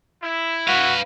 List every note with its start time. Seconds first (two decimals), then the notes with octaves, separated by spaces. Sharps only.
0.23 E4
0.68 F#4 B4 F5